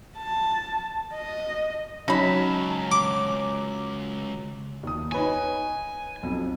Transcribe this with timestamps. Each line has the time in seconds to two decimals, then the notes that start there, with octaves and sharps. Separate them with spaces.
0.17 A5
1.14 D#5
2.08 C#2 F#3 C#4 D#4 A5 B5
2.92 D6
4.83 D#2 D#6
5.12 D#4 B4 C#5 G#5
6.23 B1 F2